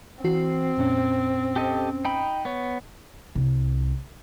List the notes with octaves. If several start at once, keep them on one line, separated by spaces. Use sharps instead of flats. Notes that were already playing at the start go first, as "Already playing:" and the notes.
E3 C4 F#4 C7
F2 A#2 C#4
G4 A4 D#5
D#4 G5 B5
B3 C#5
C2